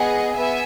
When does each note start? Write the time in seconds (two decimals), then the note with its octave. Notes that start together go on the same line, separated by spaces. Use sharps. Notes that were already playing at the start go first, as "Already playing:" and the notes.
Already playing: B3 G#4 D#5 F#5
0.34 B3 E5 G#5